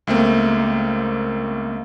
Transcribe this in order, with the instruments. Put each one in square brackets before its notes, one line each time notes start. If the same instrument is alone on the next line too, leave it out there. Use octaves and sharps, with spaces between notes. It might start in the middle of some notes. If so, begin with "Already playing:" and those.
[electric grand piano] C#2 A3 A#3 C4